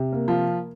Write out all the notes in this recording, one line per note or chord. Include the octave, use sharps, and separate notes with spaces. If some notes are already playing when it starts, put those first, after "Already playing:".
Already playing: C3
A#3
F3 F4